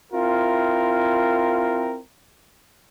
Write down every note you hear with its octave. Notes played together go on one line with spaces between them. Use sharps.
C4 E4 F4 A#4